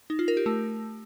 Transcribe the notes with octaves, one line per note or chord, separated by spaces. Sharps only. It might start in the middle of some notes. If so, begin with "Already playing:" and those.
D#4
F4
A#4
G4
A3